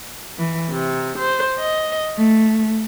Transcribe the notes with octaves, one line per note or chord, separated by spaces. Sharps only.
E3
C3
C5
D#5
A3